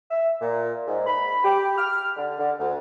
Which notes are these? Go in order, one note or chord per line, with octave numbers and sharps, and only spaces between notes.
E5
A#2
G#2
B5
G4
F6
D3
D3
D2